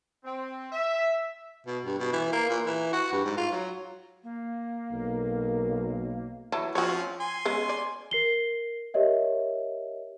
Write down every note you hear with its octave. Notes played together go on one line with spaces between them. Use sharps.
C4
E5
B2
G2
B2
E3
A#3
A#2
E3
F#4
G2
G#2
F4
F#3
A#3
B1 A#4
E3 F#3 A5
F3 C4 C#4 F#4 C#5
G#5 C6
G#3 B3 C#4
D5
A#4 C7 G7
G4 A#4 C#5 D#5 E5